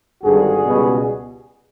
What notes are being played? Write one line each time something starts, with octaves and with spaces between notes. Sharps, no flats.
G#1 G2 D3 F#4 G#4
C#2 B2 G3